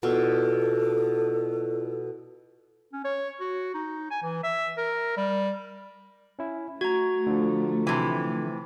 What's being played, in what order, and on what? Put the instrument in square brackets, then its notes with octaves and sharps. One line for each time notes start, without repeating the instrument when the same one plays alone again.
[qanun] B2 [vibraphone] E4 F4 D5 [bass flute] A4
[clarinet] C#4
C#5
F#4
D#4
G#5
E3
E5
A#4
G3
[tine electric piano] C#4 E4
[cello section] A3 [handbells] F#4 A#5 [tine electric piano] G#6
[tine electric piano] D3 F3
[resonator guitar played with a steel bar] C3 E3